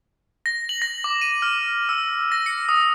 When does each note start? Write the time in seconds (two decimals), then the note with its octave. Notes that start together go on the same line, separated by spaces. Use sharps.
0.46 A#6
0.69 F#7
0.82 A#6
1.04 D6
1.21 D#7
1.42 F6
1.89 E6
2.32 A#6
2.46 C#7
2.69 D#6